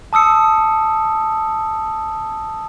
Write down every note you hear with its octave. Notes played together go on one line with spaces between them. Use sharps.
A5 D#6 E6 C#7